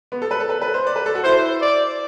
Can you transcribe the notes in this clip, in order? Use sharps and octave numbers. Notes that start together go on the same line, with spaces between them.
B3
A4
B4
A4
B4
B4
C5
D5
B4
A4
F#4
E4 C5
D5